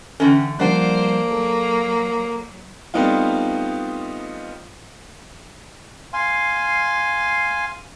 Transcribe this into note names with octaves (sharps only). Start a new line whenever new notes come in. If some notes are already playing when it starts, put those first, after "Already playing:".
D3 E3 C#4 A4 F#5 G5
F3 G3 A#3 D4 C5 F#5
F#3 A4
G3 A3 B3 C4 D#4 F4
F5 G#5 C6